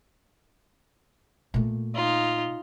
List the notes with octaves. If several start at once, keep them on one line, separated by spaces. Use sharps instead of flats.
A#2 A3
D#4 F4